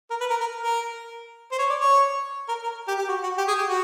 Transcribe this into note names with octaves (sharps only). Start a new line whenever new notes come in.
A#4
B4
A#4
A#4
A#4
C5
C#5
D5
C#5
A#4
A#4
G4
G4
F#4
F#4
G4
G#4
G4
F#4